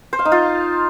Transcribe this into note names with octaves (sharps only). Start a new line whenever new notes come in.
C5
F5
D#4
F4